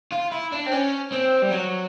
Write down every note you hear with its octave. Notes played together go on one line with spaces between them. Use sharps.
F4
E4
D4
C4
C#4
C4
G3
F#3